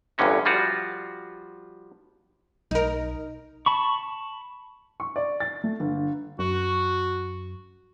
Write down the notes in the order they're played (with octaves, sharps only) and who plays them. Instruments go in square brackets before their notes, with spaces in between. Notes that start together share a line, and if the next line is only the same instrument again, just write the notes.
[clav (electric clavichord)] G1 E2 G2 D3 C#4 D#4
F3 G3 F4 F#4
[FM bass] B1 [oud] D#4 A#4
[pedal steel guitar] A5 B5 C#6
[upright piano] C#6
D5
A6
A3
G1
[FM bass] F#2 [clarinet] F#4